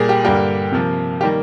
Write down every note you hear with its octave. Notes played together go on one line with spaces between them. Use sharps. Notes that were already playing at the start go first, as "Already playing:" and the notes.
Already playing: A#2 G3 A#3 G#4
G4
G2 D3 G3 A#3 G4
C3 F3 A#3
D#3 G3 A#3 G4